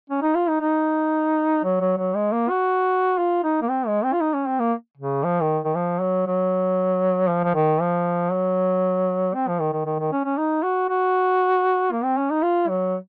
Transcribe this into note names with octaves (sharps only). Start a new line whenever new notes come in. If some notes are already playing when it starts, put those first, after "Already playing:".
C#4
D#4
F4
D#4
D#4
F#3
F#3
F#3
G#3
A#3
F#4
F4
D#4
A#3
C4
G#3
C4
F4
D#4
C#4
C4
A#3
C#3
F3
D#3
D#3
F3
F#3
F#3
F3
F3
D#3
F3
F#3
C4
F3
D#3
D#3
D#3
D#3
C#4
C#4
D#4
F#4
F#4
A#3
C4
C#4
D#4
F4
F#3